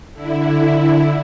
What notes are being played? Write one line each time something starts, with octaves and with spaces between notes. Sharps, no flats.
D3 E4